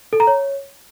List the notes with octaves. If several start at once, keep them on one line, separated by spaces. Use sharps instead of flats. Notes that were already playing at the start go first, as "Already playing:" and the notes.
A4
A#5
C#5